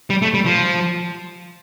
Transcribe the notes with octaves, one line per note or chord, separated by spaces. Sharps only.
G3
A3
G3
F3